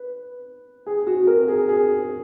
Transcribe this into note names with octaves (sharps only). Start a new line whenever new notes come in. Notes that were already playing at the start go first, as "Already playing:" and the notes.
Already playing: B4
G#4
F#4
A#4
G#4
G#4